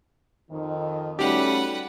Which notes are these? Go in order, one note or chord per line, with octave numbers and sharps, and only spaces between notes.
F2 D#3
G3 A3 C#4 D#4 F#4 G4 B4 F#5